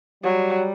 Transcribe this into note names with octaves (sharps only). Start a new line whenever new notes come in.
F#3 G3